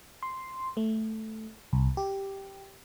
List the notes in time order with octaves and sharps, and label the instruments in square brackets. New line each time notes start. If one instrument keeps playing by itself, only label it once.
[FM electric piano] C6
A3
C2
G4